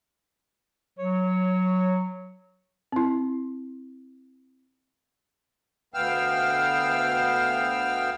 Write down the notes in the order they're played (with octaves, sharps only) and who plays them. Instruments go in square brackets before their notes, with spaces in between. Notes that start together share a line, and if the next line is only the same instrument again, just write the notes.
[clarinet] F#3 [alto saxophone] C#5
[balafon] C4 E4
[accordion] D2 B3 F5 G5 E6 F6